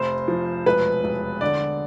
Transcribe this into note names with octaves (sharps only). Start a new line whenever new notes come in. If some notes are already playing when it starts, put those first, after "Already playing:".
Already playing: F1 C5
F3
E1 B4
E1
D3 D5